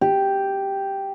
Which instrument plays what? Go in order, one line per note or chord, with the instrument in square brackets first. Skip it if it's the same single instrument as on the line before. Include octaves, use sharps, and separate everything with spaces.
[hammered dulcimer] G4